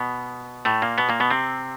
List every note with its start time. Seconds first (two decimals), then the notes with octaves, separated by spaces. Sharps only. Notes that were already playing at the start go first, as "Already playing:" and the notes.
Already playing: B2 B3
0.65 A2 A3
0.82 A#2 A#3
0.98 B2 B3
1.09 A#2 A#3
1.20 B2 B3
1.31 C3 C4